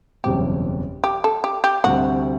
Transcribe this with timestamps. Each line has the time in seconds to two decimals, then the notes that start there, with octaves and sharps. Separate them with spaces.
0.24 F#1 E2 B2 G3 C4 G4
1.04 G4
1.24 A4
1.44 G4
1.64 G4
1.84 D2 C3 G3 C4 F#4